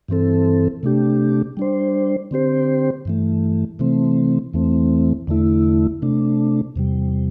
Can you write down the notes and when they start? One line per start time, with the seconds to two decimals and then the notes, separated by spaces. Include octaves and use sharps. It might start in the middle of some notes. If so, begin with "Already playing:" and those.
0.08 G2 E3 C4 A4
0.83 C3 A3 D4 G4
1.57 G3 D4 C5
2.31 D3 C4 G4 C5
3.05 G2 E3 A3
3.79 C3 E3 A3 C4
4.53 E2 E3 A3 C4
5.27 E2 D3 A3 E4
6.02 C3 A3 D4
6.76 E2 C3 G3